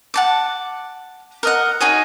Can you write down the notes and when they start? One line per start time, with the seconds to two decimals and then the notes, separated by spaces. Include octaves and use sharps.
0.14 F#5 A5 D6
1.43 A#4 D#5 F#5
1.81 D#4 F#4 G#4 C#5